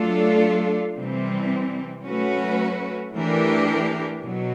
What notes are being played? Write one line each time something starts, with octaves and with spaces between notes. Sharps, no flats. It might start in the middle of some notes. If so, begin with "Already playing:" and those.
Already playing: F#3 A3 D4 F4 A4
C3 E3 G3 C4
F#3 A3 C#4 F#4 B4
E3 A3 D4 G4 A#4
B2 F#3